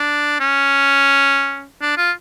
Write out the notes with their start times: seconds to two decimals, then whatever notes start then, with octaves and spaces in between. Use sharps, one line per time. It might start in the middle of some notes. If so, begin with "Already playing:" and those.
Already playing: D4
0.40 C#4
1.82 D4
1.97 F4